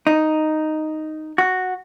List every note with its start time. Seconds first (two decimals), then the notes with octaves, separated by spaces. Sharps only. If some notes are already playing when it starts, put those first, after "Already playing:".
0.07 D#4
1.38 F#4